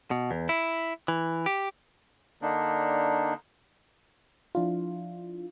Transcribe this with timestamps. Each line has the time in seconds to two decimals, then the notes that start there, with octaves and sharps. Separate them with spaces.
0.11 B2
0.31 E2
0.49 E4
1.08 E3
1.46 G4
2.42 D3 A#3 D4 D#4
4.55 F3 D4 E4 F4